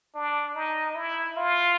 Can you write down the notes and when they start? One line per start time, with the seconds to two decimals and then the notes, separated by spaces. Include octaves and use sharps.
0.15 D4
0.55 D#4
0.95 E4
1.37 F4